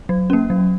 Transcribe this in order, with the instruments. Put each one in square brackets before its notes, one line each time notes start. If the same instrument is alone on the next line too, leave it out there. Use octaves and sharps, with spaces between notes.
[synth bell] F#3
A#3 C#4
F#3